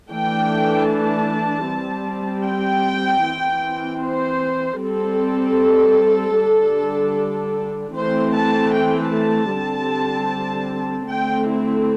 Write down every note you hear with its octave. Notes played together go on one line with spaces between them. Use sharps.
E3 A3 D4 G5
A5
G3 C4
G5
E3 C4
C5
G3 C4 A4
D3 G3 D4
E3 A3 C4 C5
A5
G5
A5
D3 G3 C4
D3 A3 C4 G5
E4